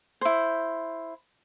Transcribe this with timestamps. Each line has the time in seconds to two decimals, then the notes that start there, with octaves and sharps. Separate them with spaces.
0.21 E4 C5